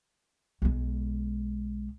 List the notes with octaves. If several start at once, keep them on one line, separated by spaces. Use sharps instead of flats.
B1 G#3